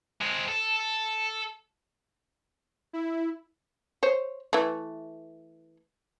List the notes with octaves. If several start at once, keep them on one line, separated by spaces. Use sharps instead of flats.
G#3 C4
A4
E4
C5 C#5
E3 A3